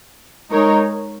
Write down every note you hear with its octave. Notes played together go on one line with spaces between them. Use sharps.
G#3 D#4 A#4 C#5